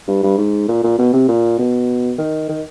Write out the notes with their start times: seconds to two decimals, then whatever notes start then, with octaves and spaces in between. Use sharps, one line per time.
0.08 G2
0.23 G2
0.38 G#2
0.68 A#2
0.83 A#2
0.98 B2
1.13 C3
1.28 A#2
1.58 B2
2.18 D#3
2.49 D#3